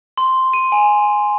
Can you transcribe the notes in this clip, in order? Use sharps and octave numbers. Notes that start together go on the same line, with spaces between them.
C6
D#7
G#5